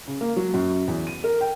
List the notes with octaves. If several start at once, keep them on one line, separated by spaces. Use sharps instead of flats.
C#3
A#3
F#3
F#2
E2
D#7
A#4
G5